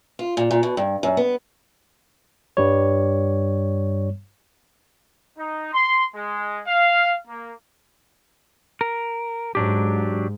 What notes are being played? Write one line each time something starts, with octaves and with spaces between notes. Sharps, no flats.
F4
A#2
A#2
B2
G2
F#2
B3
G2 G3 C#5
D#4
C6
G#3
F5
A#3
A#4
G#2 F#3 D4 G4